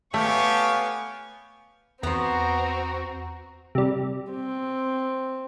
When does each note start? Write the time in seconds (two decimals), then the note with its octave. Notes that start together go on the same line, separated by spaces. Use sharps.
0.14 A3 B3 G4 C#5 F5 G#5 C#6
2.03 E2 B3 C4 F#4 C5 A#5
3.75 C3 G3
4.32 C4